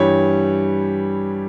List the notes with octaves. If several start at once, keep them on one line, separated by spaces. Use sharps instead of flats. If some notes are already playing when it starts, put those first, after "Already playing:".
Already playing: G2 E3 G3 C#5